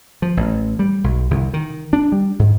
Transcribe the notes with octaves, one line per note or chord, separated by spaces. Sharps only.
F3
A1
G3
B1
C2
D#3
D4
G3
G#2